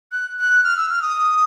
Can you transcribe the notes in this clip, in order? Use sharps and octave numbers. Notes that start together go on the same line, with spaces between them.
F#6
F#6
F6
E6
F6
D#6